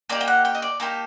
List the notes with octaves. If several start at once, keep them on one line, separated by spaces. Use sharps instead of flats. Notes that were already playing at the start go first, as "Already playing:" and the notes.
A#3 D#4 G4 D5
G5
F#5
G5
D#5
D5
A#3 D#4 G4 A4